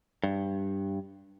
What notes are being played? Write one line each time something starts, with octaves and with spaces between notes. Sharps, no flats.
G2